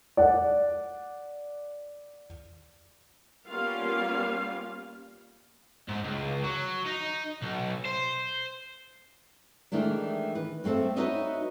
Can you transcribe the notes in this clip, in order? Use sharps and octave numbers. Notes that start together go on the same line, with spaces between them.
D5 F#5
G3 A#3 B3 C#4 F4 F5
G#2
C#2
F#3
D#4
B1
C5
D#3 E3 G#3 A3 D4
B4
G2 A3 C4 A4
D#4 F#4 B4 C#5 D#5 E5